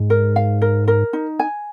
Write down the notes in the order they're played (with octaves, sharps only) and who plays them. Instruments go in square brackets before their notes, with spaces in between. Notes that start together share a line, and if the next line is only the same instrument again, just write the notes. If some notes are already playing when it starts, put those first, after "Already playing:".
Already playing: [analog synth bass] G#2
[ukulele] A#4
F5
A#4
A#4
D#4
G#5